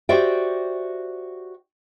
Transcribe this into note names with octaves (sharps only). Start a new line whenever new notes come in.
F#4 G4 C5 D5 E5 G5